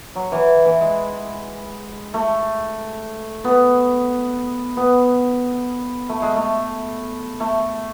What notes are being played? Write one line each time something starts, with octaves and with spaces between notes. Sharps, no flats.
F#3
E3
E3
G#3
A3
B3
B3
A3
G#3
A3
A3